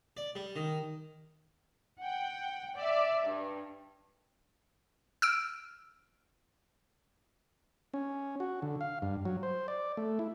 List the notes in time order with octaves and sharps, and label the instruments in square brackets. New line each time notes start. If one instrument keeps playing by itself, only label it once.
[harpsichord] D5
G3
D#3
[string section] F#5 G5
D5 E5
G2
[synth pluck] E6 F6 D7
[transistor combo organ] C#4
F#4
D3
F5
G2
F#3
C5
D5
A3
E4